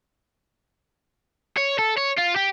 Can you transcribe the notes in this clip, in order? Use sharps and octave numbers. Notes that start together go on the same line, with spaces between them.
C#5
A4
C#5
F4
G4